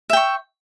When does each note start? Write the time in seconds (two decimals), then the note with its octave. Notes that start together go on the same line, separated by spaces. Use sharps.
0.10 E5
0.13 G5
0.17 C#6